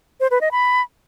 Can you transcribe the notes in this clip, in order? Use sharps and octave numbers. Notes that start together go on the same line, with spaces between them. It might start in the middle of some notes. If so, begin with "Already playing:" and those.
C5
B4
D#5
B5